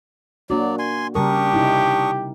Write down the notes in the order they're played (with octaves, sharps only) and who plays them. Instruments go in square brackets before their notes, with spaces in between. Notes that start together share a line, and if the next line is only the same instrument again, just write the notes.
[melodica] F#3 D5 [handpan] A#3 D4 F#4
[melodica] G#5 C6
[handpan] C#3 G3 A#4 [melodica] D4 C#6 D#6 [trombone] G4
[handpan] C3 D#4 E4